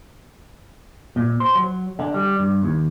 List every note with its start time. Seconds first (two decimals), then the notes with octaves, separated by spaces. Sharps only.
1.16 A#2
1.40 C5
1.55 F#3
1.99 D3
2.14 G3
2.39 G2
2.63 D#2